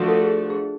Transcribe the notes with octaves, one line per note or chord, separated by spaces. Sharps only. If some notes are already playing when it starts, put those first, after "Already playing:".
Already playing: F3 A3 D4 F#4
A4
G#4
G#4